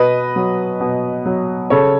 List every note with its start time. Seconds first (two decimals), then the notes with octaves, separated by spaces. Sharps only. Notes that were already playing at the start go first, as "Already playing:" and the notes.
Already playing: B2 B4 D#5
0.36 F#3
0.80 B2
1.26 F#3
1.70 C#3 A4 C#5